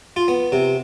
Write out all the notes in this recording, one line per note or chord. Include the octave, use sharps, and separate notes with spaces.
F4
B3
C3